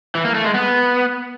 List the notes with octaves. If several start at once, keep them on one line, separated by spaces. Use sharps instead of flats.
E3
A#3
A3
G#3
B3